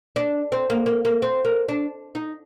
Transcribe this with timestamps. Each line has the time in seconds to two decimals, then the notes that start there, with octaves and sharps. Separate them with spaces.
0.16 D4
0.52 C4
0.70 A#3
0.86 A#3
1.05 A#3
1.22 C4
1.45 A#3
1.68 D4
2.15 D#4